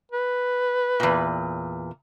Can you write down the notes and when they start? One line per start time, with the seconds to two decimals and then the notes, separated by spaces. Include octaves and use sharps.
0.12 B4
1.00 E2 A#2